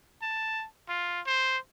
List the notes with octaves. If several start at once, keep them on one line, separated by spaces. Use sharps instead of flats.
A5
F4
C5